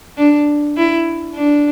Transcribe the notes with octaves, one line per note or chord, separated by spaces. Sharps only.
D4
E4
D4